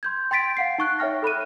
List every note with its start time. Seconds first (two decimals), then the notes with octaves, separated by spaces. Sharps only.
0.03 C6 G6 G#6
0.31 G5 C6 A6 B6 D7
0.57 F5 F#5 C7
0.78 D#4 C#6 F#6
0.99 C#5 E5 G5 F6 A#6
1.22 A4 B5 F#6 D#7